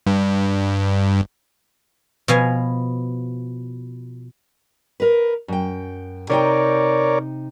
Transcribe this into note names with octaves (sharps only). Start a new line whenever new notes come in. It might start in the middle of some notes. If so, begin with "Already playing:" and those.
G2
B2 F3 F5 G#5
A#4 B4
F#2 G5
C3 D#4 A#4 C#5 D5 G5